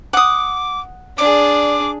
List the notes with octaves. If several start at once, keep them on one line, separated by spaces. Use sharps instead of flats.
F#5 D6 D#6
D4 G#4 D5 D6